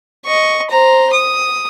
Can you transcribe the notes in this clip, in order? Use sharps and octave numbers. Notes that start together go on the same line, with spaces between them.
D#5 C#6
C5 A#5
D#6